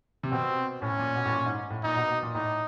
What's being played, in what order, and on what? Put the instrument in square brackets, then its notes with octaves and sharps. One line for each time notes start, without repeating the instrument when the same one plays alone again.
[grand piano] C3
[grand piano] B2 [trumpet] C4
[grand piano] A2 [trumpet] C#4
[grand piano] A#2
B2
A2
A#2
G#2
A2
[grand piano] A#2 [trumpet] D#4
[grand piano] B2
B2
A#2
[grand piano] A2 [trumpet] D#4